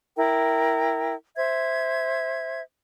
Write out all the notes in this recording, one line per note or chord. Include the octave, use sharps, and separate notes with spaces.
E4 A#4 G5
C5 E5 G#6